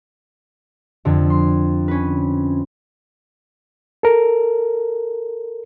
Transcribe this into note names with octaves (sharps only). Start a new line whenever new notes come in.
F2 D3
C6
C#4 B4
A4 A#4